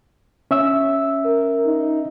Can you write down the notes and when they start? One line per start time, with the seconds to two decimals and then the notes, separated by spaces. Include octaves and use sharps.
0.51 C#4 E5 E6
1.25 A#4
1.66 D#4